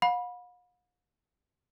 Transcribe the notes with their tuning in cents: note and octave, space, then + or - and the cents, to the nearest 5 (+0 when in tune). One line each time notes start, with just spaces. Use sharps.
F5 +45 B5 -15